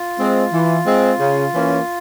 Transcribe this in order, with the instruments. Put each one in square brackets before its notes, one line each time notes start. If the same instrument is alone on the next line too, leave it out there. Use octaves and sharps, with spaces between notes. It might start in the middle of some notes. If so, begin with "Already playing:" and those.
Already playing: [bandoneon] F4
[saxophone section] G#3 C4
E3
G#3 C4
C#3
E3 A#3 C#4